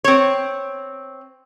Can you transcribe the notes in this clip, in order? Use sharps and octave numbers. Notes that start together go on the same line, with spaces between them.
C4 C#5